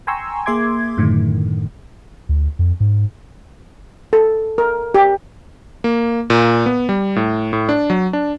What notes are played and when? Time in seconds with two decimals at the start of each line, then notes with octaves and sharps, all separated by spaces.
0.07 G5 G#5 A#5 C6 C#6 E6
0.46 A#3 G#4 E5 C6 D6 G#6
0.97 F#2 A2 D3 D#3
2.29 D2
2.59 F2
2.80 G#2
4.13 A4
4.58 A#4
4.94 G4
5.84 A#3
6.30 A#2
6.66 B3
6.89 G3
7.16 A2
7.53 A2
7.69 D4
7.90 F#3
8.13 D4